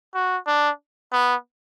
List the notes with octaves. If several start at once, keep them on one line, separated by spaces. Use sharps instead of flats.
F#4
D4
B3